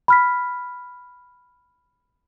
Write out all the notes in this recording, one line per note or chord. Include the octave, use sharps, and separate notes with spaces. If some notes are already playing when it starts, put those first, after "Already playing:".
B5 F6 B6